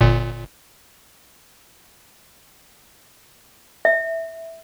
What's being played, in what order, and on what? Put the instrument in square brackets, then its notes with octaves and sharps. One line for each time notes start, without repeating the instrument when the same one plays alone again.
[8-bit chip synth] G1 A#2
[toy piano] E5